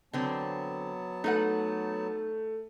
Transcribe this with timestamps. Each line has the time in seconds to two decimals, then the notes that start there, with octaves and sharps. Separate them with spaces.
0.13 D3 F#3 B3 C4 A5
1.24 A3 D#4 B4 F#5